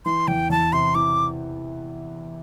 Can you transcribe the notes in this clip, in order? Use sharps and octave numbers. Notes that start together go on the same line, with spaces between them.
E3 C6
E2 G5
E2 A5
C3 C6
E3 D6